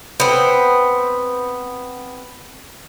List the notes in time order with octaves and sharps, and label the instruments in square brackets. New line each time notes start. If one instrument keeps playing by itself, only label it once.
[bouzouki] B3 C4